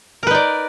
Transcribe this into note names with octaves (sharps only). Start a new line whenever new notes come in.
D#4 A#4 B4 D5